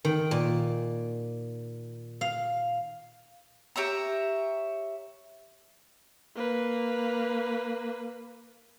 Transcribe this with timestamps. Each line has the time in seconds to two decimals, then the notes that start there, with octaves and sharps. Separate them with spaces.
0.05 D#3
0.31 A#2
2.21 F5
3.76 G4 C#5 E5 A#5
6.35 A#3 B4